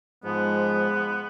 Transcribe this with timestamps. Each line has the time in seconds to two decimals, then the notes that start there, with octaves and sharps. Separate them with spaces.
0.24 G#2 F3 G#3 B3